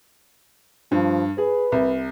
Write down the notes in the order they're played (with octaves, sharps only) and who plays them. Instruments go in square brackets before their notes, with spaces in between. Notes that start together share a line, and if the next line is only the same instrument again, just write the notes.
[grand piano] G2 [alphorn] F3
[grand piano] G#4 [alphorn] B4
[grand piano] C2